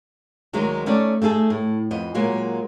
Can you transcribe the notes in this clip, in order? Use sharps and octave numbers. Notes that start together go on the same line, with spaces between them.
D2 D#3 F#3 G#3
A3 C#4 D#4 A4 D5
A3 D#4 G#4 A4
A2
F2 B3 D#5
A#2 F#3 G#3 A#3